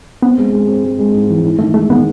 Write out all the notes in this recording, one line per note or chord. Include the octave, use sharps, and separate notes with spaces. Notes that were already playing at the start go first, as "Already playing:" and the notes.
B3 C4
G#3
G#3
C4
G#3
G#3
G#2
E3
E4
D#3 A3
G#3 A3
D#3 B3